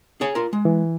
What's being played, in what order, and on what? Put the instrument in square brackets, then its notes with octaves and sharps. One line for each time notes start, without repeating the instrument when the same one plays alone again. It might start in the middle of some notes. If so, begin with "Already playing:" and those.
[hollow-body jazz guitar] G#4 C#5 G#5
F4 A#4
G#3
[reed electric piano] E3